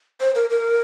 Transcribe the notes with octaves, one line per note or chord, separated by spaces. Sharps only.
C5
A#4
A#4